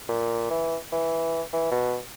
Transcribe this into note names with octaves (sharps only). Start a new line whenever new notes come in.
A#2
E3
E3
E3
B2